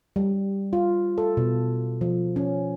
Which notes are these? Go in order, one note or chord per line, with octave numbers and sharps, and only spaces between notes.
G3
F4
A4
B2
F3
C#4